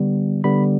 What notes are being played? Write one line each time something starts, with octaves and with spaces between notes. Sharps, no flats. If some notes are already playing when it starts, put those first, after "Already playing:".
Already playing: D3 G3 B3
D3 G3 B3 B5